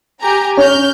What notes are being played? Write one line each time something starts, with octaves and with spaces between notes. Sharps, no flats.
G4 G#5 A#5
C#4 F6 G6